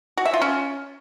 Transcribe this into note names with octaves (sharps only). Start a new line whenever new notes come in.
F#4
E5
F4
C#4